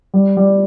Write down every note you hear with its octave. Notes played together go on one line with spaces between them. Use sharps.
G3
G3